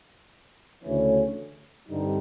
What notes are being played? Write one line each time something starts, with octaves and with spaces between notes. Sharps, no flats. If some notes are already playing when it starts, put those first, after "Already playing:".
D2 C#3 E3 A3 C#4
G2 D3 G3 C4 D#4